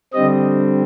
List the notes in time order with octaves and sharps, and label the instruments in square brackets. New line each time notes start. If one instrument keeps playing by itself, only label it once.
[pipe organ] D3 G3 C4 D#5